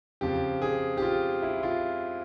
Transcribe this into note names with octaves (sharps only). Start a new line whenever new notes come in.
F2 C#3 F3 G4
G#4
G4
F4
E4
F4